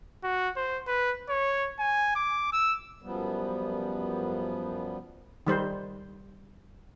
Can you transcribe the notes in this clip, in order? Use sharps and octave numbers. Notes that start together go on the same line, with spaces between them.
F#4
C5
B4
C#5
G#5
D6
E6
F#2 F3 G3 B3
D#3 G3 C5